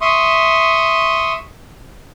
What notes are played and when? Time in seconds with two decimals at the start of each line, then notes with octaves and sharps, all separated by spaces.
0.01 E5 C6 C#6 D#6